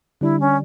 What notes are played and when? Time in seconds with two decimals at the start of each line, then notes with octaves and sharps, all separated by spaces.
0.21 D3 G3 D4 E4
0.40 C#4